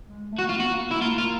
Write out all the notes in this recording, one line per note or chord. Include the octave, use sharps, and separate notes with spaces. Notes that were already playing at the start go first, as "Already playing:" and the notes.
G#3
A3
A#3 F#4
F4
B3
F#4
A#3
A#3
E4
A3
A#3 F4
F4